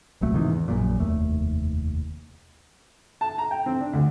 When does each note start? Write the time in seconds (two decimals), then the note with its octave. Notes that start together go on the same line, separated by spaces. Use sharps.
0.21 D#1 C2 F#3 A3
0.33 G#2 C3 D#3 E3
0.52 E2
0.68 A#1 F#2 A#2
1.00 F1 D#2 A3
3.21 A5
3.38 A#5
3.51 G5
3.66 C4
3.81 D4
3.93 D2